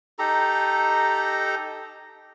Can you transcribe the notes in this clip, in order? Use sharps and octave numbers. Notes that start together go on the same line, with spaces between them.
D#4 G4 A4 A#5